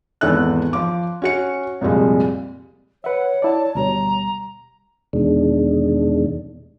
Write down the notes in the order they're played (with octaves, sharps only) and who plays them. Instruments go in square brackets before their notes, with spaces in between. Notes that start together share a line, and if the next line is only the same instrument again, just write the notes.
[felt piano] G#1 E2 D#3 A4 E5 F#6
F3 D6
C#4 F#4 C#7
C2 F2 A#2 G3 G#3
[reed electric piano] B4 E5 [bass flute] C#5 [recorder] F#5
[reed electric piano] E4 D5 [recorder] A5
[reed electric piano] D2 B2 G3 [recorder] A#5
[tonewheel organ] E2 B2 D#3 G#3 D4